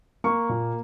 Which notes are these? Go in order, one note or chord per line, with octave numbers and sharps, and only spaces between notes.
A#3 C#6
A#2